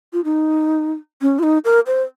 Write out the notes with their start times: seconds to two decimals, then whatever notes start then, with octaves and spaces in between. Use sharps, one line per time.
0.13 F4
0.25 D#4
1.22 C#4
1.39 F4
1.43 D#4
1.65 A#4
1.87 C5